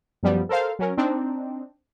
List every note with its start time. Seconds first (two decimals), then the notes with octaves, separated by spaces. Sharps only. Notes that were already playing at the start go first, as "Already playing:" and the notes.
0.23 F#2 F3 G3 B3
0.49 A4 A#4 C5 F5
0.79 F#3 C#4 A#4
0.97 C4 D4 D#4